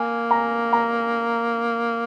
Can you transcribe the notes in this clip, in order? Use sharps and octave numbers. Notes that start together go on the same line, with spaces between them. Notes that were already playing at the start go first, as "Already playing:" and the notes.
Already playing: A#3 G#5
A#5
A#5